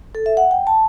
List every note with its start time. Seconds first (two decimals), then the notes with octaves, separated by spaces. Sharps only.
0.15 A4
0.26 E5
0.37 F#5
0.51 G5
0.67 A5